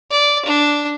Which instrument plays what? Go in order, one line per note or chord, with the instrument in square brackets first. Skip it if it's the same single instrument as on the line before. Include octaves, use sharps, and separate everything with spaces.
[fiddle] D5
D4